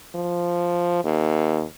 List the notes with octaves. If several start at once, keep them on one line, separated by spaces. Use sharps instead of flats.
F3
D#2